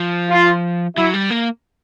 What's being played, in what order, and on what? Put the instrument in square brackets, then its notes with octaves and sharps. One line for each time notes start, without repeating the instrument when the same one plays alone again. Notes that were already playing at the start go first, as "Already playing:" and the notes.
Already playing: [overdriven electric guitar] F3
[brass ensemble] F4
[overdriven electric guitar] F#3 [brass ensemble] E4
[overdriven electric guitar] G3
A#3